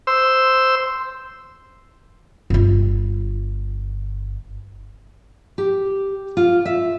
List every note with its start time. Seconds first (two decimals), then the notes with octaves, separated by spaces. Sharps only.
0.07 C5 E6
2.50 G1 F4
5.58 G4
6.37 F4
6.65 E5